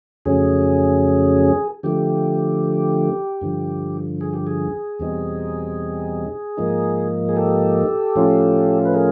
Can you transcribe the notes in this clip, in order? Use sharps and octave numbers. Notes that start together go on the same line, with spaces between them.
F2 C#3 F#3 A3 C#4 G#4
D3 F3 A3 G4
G2 D3 F3
G#4
G4
G#4
E2 B2 G3 C4 D#4
G#2 F3 A#3 D#4
G#4
G4 A4
A2 F3 A3 C#4 F4
B4
G#4 A#4